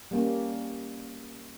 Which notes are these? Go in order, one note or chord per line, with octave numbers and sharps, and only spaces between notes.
G3 A#3 C#4